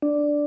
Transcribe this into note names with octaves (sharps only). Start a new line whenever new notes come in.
D4